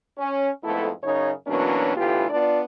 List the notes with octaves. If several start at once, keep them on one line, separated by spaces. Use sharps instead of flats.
C#4
F2 G#2 A3 B3 E4 A4
F#2 C#3 D#4 C#5
B2 E3 F#3 A#3 C#4 D4
D2 A2 E3 B3 F4 G4
B3 D4 F4 D5